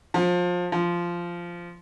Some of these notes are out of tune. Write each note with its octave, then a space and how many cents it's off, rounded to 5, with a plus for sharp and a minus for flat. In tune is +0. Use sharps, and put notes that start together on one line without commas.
F3 +25
F3 -10